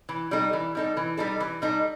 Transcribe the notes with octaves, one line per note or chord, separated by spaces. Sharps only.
E3
G3 D#4 A4
E3
G3 D#4 A4
E3
G3 D#4 A4
E3
G3 D#4 A4